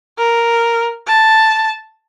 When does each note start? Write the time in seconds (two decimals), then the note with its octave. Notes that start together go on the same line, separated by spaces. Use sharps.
0.18 A#4
1.07 A5